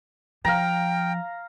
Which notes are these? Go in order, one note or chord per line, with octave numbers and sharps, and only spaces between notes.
F3 F5 G5 A#5